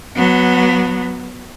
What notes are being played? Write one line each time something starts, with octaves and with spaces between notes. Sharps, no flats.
F#3 B3